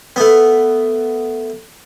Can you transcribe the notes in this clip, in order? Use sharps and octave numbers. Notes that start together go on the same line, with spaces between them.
A3 B3